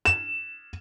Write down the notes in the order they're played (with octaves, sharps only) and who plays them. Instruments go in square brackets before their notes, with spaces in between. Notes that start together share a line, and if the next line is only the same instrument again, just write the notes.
[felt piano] E7